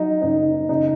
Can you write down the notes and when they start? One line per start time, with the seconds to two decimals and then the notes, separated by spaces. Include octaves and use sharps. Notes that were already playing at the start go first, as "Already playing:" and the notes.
Already playing: F#3 D#4
0.22 F#1 D#4
0.69 C#3 D#4